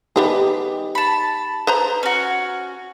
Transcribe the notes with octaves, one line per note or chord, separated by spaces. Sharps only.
G3 B3 D#4 G4 G#4 C#5
A5 B5
B4 C5 A#5
C#4 F#4